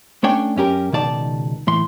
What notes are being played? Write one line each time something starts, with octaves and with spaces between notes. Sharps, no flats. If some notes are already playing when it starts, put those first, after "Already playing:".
A3 C#4 D4 C#5 D5 G5
F#2 C#4 G4 A#4
C#2 B2 D#3 D5 A5
A2 E3 C6